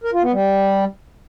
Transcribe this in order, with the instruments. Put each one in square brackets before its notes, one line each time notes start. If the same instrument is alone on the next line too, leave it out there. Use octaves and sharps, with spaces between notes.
[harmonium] A#4
F4
B3
G3